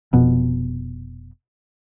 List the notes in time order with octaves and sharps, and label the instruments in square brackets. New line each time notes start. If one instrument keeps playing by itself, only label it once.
[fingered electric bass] F1 B2